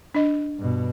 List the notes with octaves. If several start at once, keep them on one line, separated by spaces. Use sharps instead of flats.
D4 D#5
G2 B2